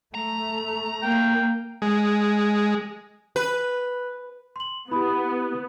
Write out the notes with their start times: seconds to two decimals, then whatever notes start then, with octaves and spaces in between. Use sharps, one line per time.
0.15 A3 A#5
1.02 A#3 G5
1.82 G#3
3.36 B4
4.56 C6 F#7
4.91 B3 E4 G4 B5 D#6